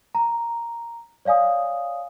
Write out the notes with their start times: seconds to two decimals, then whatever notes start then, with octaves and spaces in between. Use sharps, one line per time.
0.15 A#5
1.25 C#5 D5 F5 G#5 D#6